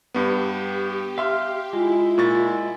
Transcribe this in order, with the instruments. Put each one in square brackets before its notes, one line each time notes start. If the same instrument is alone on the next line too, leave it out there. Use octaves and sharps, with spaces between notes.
[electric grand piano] G2 B3 [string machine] G4
[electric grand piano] E5 [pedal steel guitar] F5 C6 F6
[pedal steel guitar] G#3 [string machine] E4 [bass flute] F4
[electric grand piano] A#2 C#6 A6